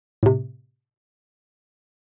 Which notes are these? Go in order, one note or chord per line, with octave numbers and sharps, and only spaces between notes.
A2 C3